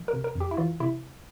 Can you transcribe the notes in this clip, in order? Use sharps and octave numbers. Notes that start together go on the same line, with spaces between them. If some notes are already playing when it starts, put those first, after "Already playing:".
Already playing: F3
A#4
C3
A#4
F2
G4
E4
E3 F4
C3 E4